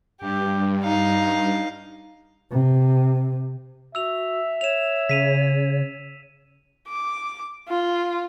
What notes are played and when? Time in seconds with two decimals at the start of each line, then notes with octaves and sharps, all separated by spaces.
0.21 G2 G4
0.83 D#4 F5
2.52 C3
3.95 F#4 E5 E6 F7
4.61 C#5 E7 F7
5.09 C#3 B6 D#7 F7
6.88 D6
7.68 F4